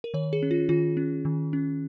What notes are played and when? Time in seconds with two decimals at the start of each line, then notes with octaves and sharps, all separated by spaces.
0.04 A#4
0.14 D#3 C#5
0.33 G#4
0.42 C#4
0.51 F4
0.69 D#3 F4
0.97 C#4
1.25 D#3
1.53 C#4